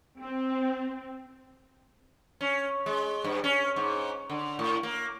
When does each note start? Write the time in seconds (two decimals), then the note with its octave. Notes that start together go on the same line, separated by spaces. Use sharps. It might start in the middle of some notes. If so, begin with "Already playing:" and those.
0.22 C4
2.41 C#4
2.86 G#3
3.24 G2
3.44 C#4
3.76 G#2
4.30 D3
4.59 A2
4.83 A#3